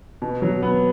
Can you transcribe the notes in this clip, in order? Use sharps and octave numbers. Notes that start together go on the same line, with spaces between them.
B2
F#3
B3